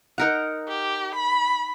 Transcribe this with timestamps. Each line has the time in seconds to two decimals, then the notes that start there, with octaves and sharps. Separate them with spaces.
0.18 D#4 A#4 F#5
0.68 G4
1.15 B5